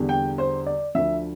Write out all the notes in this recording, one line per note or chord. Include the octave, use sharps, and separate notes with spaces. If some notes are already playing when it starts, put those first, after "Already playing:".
Already playing: E2 D3 G3
G5
C5
D5
D2 D3 F3 E5